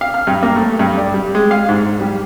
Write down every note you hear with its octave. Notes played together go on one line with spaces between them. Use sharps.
F5
F6
G2
A#3
A3
G2
D5
G3
G#3
F5
G#2
G3